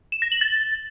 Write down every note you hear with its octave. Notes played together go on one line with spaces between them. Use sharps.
E7
A#6
F#7
A6